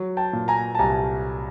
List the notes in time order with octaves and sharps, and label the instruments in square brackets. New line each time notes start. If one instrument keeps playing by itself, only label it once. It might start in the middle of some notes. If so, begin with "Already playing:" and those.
Already playing: [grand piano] F#3
G5 A5
A#2
G#5 A#5
A5
C2 G#5 A#5